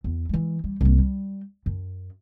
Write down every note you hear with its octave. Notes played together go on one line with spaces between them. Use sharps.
E2
E3 G#3
G3
C2 A#3
G3
F#2